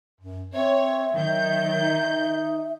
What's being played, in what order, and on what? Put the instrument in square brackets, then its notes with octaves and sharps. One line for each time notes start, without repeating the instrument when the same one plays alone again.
[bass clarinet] F#2
[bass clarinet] C4 [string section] C#5 [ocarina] E5
[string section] D#3 G6 [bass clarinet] F#3
[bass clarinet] D#4